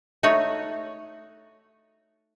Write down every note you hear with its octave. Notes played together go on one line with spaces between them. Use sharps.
A3 D#4 F#4 C#5